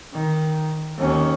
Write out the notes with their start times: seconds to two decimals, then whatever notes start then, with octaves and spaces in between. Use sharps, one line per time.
0.13 D#3
0.98 D#2 C#4